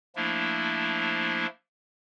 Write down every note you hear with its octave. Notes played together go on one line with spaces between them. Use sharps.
F3 A3 A#3 D4 E4